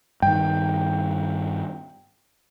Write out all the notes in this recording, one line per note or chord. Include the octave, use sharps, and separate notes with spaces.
G2 D#3 G5